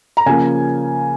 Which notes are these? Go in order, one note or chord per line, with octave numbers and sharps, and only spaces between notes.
A#5
C#3 F3 A#3 G#5